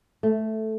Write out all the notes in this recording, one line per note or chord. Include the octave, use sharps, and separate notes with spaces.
A3